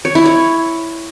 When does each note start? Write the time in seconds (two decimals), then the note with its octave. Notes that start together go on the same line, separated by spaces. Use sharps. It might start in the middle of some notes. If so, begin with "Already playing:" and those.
0.05 C#5
0.15 E4
0.26 C#5